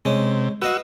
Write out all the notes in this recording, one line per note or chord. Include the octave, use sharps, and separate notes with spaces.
C3 G#3 C#4
F#4 B4 D#5 F5 E6